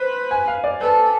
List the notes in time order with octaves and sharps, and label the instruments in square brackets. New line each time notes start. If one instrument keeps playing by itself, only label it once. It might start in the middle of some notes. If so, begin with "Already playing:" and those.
Already playing: [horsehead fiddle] B4 [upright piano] C5
[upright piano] G#5
F5
D5
[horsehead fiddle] A4 [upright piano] B4